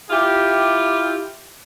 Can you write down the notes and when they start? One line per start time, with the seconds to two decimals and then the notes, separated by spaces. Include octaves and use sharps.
0.10 E4 F4 G4